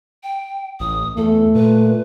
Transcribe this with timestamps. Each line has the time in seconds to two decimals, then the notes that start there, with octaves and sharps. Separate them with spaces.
0.23 G5
0.80 A1 D#6
1.17 E2 A3 A4
1.55 A#2 B4